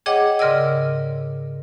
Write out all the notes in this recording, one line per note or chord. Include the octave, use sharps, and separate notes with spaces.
G#4 C#5 D#5 F#5 G5 D6
G#2 C#3 A#4 D5 D#5 E6